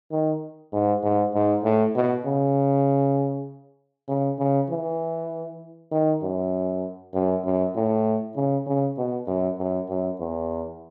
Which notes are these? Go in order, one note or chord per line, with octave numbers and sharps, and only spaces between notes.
D#3
G#2
G#2
G#2
A2
B2
C#3
C#3
C#3
E3
D#3
F#2
F#2
F#2
A2
C#3
C#3
B2
F#2
F#2
F#2
E2